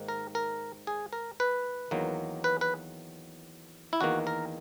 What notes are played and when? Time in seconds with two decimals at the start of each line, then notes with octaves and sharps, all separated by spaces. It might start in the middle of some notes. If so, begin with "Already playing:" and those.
Already playing: G#2 D#3 A#3
0.08 A#4
0.35 A#4
0.87 G#4
1.13 A#4
1.40 B4
1.91 E2 D#3 F#3 A#3
2.44 B4
2.61 B4
3.93 E4
4.01 E2 D#3 A#3 F#4
4.27 A#4